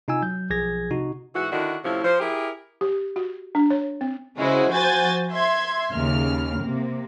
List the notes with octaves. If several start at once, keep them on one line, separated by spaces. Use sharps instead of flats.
C3 D#4 F4 G#5 E6
F#3 G6
B1 F3 G#4 G#6 A#6
C3 D#4 F#4
G#2 E3 F#4
D3 D#3 D4 E4 F#4
A2 C3 F3 C#4 E4
F3 C5
E4 G4 G#4 A#4
G4
F#4
D4
C#5
C4
C#3 G#3 C#4 E4 F#4 C5
F3 F#4 C5 G#5 G6 A6
E5 C6 G#6
D#2 C#3 F6
C3 A#3